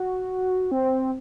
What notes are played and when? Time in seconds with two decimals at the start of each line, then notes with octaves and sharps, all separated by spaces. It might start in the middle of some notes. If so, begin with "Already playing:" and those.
Already playing: F#4
0.71 C4